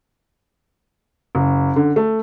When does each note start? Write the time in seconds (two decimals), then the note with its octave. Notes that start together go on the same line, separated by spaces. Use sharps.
1.35 F#1
1.76 D3
1.96 A3